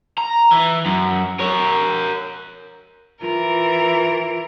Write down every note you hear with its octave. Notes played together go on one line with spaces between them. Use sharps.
A#5
E3
F#2
A#4 C#5
E3 F4 A#4